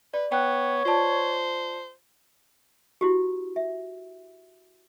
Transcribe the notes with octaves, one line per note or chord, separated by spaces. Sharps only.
B4 D5
B3 C#5 G5 F#6
F4 C5 D5 A5
E4 F#4 G4
E5